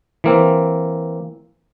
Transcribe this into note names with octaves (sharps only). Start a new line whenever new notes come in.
E3 A#3 C4